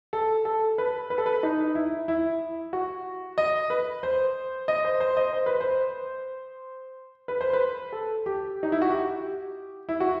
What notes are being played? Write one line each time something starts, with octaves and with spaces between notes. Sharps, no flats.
A4
A4
B4
B4
A4
B4
D#4
E4
E4
F#4
D#5
B4
C5
D#5
C5
C5
D#5
C5
B4
C5
B4
C5
B4
A4
G4
D#4
E4
F#4
G4
E4
F#4